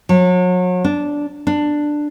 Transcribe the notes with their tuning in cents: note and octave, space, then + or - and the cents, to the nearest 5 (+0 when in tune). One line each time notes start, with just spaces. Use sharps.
F#3 -35
D4 -10
D4 +10